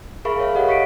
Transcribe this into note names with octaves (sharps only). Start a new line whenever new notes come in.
G#4 A#4 E5 F5 B5 C#6
C#5 E5 F5
G4 A4 D#5 F#5
C#6 B6 C#7 D7